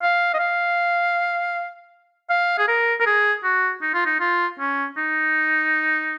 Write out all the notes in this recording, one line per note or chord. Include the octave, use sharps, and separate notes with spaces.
F5
D#5
F5
F5
G#4
A#4
A#4
G#4
F#4
D#4
F4
D#4
F4
C#4
D#4